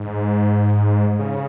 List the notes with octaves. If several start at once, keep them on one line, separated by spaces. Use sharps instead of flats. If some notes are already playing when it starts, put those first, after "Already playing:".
Already playing: G#2
C#3